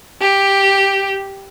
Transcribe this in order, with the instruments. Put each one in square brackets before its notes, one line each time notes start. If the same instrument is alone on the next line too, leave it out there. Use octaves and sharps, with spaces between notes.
[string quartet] G4